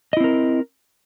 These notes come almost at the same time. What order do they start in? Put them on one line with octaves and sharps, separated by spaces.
D#5 E4 C4 A#4